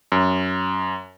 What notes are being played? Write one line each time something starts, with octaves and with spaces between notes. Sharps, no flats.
F#2